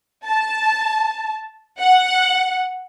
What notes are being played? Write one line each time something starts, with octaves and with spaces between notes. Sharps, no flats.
A5
F#5